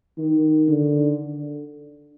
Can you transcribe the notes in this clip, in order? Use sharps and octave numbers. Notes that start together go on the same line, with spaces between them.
D#3
D3